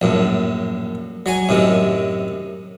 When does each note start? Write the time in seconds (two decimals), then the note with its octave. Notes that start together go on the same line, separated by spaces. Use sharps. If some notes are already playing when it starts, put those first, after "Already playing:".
0.02 A#1 F#2 A2
1.26 F#3 C#5 G#5
1.49 F#2 A2 C3 D#3